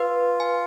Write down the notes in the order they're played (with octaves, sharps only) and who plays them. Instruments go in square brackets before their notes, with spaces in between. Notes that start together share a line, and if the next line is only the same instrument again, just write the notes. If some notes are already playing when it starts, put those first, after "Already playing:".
Already playing: [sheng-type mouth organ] F4 [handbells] B4
[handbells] G#5